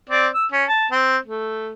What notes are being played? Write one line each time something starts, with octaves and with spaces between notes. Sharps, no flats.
C4 D5
E6
C#4
A5
C4
A3